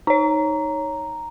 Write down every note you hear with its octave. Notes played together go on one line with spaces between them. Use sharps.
D#4 C#5 A#5